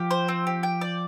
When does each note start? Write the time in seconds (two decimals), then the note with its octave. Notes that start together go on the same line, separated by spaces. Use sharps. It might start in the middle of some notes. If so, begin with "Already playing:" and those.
Already playing: F3 G4
0.11 C5
0.28 C4
0.47 G4
0.63 G5
0.81 D5